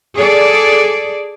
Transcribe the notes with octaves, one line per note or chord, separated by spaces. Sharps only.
G#4 A4 D5